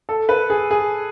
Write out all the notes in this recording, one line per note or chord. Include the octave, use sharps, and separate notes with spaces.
A4
B4
G#4
G#4